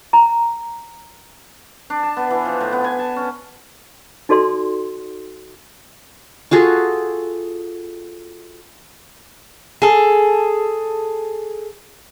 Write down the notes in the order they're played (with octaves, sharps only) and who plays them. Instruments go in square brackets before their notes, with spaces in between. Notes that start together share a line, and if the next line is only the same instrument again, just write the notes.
[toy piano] A#5
[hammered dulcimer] D4
A5
B3
E3
F3
A2
B3
G#5
A5
C#4
[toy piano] D#4 F#4 A4 D5 C6
[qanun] F4 F#4 G#4 A4
[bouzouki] G#4 A4